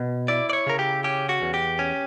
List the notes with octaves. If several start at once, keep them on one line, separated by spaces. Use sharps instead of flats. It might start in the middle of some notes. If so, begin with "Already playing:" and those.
Already playing: B2
E4 D5
D5
C#5
C#3 A#4
G4
C#4 G4
F#4
E2
G4
C#4